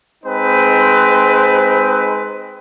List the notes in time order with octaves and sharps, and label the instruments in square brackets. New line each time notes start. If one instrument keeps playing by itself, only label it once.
[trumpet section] G#3 C4 D#4 B4 C5